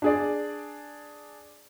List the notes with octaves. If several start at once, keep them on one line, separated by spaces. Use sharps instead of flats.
D4 G#4 D5